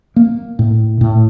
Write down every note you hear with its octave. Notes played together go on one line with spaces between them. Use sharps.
A#3
A2
A2